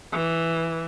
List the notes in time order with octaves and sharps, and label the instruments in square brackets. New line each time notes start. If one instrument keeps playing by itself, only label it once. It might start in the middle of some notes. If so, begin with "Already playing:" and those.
[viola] E3